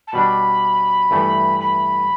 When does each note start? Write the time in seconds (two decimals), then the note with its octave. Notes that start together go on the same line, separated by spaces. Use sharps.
0.07 A5
0.13 B2 G3 D4 B5
1.11 G2 E3 A3
1.60 B5